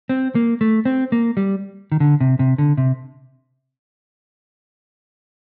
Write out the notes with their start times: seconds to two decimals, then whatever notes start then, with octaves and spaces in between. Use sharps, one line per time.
0.09 C4
0.35 A#3
0.61 A3
0.85 C4
1.12 A#3
1.37 G3
1.92 D#3
2.00 D3
2.20 C3
2.39 C3
2.58 D3
2.77 C3